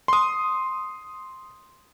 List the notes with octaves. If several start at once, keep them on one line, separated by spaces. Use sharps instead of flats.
C6 D#6